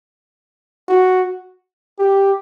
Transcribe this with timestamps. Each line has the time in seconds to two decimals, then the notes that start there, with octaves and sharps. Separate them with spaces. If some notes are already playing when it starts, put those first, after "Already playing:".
0.88 F#4
1.99 G4